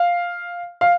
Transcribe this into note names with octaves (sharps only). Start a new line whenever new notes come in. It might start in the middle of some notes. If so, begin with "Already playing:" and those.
Already playing: F5
F5